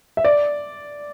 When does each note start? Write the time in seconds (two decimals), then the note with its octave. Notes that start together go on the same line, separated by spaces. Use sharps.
0.17 E5
0.25 D5